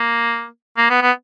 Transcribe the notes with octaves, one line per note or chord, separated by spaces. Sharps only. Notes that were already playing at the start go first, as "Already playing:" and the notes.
Already playing: A#3
A#3
B3
B3